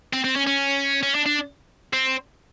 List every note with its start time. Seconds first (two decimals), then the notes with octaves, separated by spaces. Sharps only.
0.13 C4
0.24 C4
0.36 C#4
0.47 C#4
1.03 C#4
1.15 D4
1.26 D4
1.93 C4